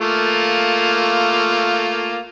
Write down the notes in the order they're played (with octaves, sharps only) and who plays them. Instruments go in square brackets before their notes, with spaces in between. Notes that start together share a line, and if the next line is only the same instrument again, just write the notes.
[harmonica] A3 A#3 F4